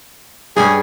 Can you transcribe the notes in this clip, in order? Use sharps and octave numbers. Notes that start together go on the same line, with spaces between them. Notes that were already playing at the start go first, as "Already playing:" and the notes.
G2 G3 C#4 G#4